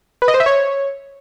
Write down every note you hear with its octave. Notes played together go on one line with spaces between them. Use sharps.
B4
D#5
C5
E5
C#5